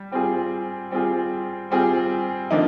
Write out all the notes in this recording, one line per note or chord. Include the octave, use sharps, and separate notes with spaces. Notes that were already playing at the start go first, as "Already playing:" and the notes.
Already playing: G3
G3 C4 F4 G#4
G3 C4 F4 G#4
G3 C4 F4 G#4
D3 F3 A#3 D#4